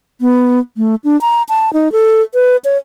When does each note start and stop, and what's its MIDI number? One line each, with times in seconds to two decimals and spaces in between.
0.21 0.60 59
0.77 0.95 57
1.04 1.19 62
1.21 1.43 82
1.49 1.73 81
1.73 1.91 63
1.92 2.21 69
2.34 2.57 71
2.65 2.77 73